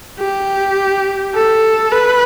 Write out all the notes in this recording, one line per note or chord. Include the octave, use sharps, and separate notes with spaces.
G4
A4
B4